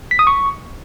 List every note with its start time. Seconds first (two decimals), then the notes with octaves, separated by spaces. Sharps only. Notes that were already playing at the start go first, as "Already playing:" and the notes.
0.11 B6
0.19 D#6
0.27 C#6